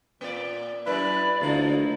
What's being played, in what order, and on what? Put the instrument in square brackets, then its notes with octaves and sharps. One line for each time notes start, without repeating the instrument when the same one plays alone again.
[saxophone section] A#2 [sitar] A#3 D5
[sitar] F#2 [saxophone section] E4 B4 [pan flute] D5
[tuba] D2 [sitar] F3 D#4 [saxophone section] A#3 E4